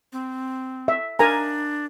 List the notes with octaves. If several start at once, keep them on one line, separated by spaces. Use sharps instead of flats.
C4
E5
D4 A#4 G#5 A#5